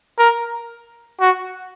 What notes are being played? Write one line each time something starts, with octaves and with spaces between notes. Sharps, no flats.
A#4
F#4